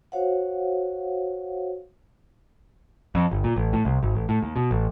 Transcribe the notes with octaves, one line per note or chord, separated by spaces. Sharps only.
F#4 C5 C#5 F5 F#5
F2
G1
A#2
A1
A2
C2
G#1
A1
A2
D#2
B2
A1